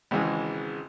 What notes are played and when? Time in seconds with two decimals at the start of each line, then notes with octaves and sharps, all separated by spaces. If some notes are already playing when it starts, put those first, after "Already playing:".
0.11 G#1 G#2 C#3 E3 G#3